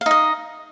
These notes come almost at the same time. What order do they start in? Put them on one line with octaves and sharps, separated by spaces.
F5 D#4 D#5